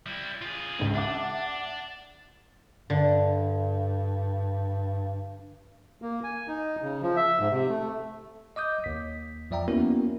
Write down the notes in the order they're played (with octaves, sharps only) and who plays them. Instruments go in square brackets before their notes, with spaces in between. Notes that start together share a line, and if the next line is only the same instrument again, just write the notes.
[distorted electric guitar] G3 E4
F4 G#4
[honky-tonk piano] G#1 C#2
[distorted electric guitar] D4 [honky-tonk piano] E5 F#5 D6
[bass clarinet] G2 [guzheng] D3
[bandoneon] A#3
G#5
D#4
C#3
F3
E5
G#2
C3
A3
[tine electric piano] D#5 D6 D#6 G6
D#2 B6
F2 F3 D5 E5 G5 A#5
A#3 B3 C#4 E4 F#4 A#4